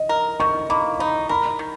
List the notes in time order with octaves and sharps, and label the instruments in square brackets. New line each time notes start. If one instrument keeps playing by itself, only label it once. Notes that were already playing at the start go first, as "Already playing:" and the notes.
Already playing: [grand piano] D#5
[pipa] A#4
[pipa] D#3 [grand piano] C#6
[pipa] A#3 [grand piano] B5
[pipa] D#4 [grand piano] B5
[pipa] A#4 [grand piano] B5
[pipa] D#3